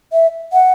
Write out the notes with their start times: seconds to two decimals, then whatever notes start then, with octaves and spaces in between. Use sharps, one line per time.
0.12 E5
0.53 F#5